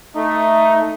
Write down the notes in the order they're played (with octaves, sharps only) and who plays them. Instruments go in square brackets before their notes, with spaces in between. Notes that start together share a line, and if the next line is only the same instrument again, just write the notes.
[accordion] A3 [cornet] D#4